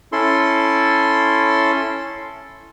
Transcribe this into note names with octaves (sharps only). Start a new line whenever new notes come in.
C#4 E4 A4 C6